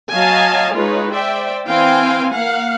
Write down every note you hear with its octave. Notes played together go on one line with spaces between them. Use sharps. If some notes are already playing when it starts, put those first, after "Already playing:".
F#3 D#5 F5 G#5 A5
G#3 D#4 F4 B4 C#5
C5 D5 E5 G5
E3 C4 F5 G5 G#5
A#3 F5 F#5